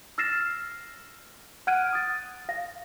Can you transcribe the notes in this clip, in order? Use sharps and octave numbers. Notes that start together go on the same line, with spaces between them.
E6 F6 A6 A#6 C7 E7
F#5 F6 F#6 G#6 D7 D#7
D#6 A6
F5 A#6